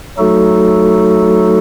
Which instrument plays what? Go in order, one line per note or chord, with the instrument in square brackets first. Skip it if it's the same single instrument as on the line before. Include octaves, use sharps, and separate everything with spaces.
[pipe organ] F#3 A3 D#4 F#4 A4